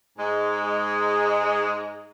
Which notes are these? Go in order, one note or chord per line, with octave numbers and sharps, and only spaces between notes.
G#2 G#3